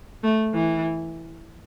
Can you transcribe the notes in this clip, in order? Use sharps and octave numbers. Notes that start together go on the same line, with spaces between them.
A3
E3